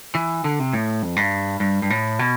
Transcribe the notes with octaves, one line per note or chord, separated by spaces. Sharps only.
E3
D3
C3
A2
F2
G2
G2
G2
A2
B2